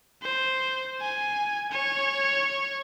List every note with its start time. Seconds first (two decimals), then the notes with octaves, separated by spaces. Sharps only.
0.23 C5
1.01 G#5
1.71 C#5